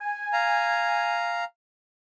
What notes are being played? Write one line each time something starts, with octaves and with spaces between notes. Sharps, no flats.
G#5
F5 A#5